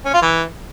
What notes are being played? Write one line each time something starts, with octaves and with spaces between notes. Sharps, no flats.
C#4
F4
E3